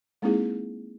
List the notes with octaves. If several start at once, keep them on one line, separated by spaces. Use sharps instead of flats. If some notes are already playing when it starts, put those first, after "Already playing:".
G#3 A#3 C4 D#4 E4 G#4